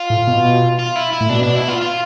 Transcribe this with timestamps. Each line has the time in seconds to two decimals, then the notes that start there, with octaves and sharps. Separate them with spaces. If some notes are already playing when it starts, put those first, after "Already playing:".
Already playing: F4
0.10 A2
0.27 B2
0.79 F4
0.95 E4
1.13 E4
1.21 A2
1.29 B2 D4
1.43 D4
1.55 E4
1.68 F4
1.81 F4